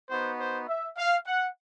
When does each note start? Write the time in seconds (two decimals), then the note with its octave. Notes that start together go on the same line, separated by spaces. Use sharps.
0.10 B3 D#4 F#4 C5
0.39 C5
0.68 E5
0.97 F5
1.26 F#5